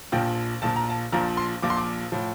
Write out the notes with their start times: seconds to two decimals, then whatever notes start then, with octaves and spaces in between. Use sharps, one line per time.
0.12 A#1 A#2 F3 G5
0.62 A#1 A#2 F3 A5
0.76 A#5
0.90 A5
1.12 A#1 A#2 F3 A#5
1.37 C6
1.63 A#1 A#2 F3 D6
1.70 C6
1.77 D6
2.12 A2 F3